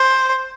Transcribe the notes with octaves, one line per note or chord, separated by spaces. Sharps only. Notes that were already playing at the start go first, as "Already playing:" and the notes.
Already playing: C5